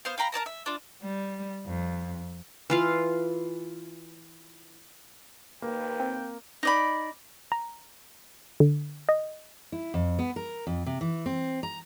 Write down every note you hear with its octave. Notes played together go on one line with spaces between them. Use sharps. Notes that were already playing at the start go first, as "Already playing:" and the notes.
B3 C5 F5
F5 G5 A#5 B5
A#4 D5 A5 A#5
E5
D4 F4
G3
F2
E3 F4 F5
D#2 A#3 B4 G5
C4
D#4 D5 B5
A#5
D3
D#5
E4
F2
B3
A#4
F2
C3
E3
C4
A#5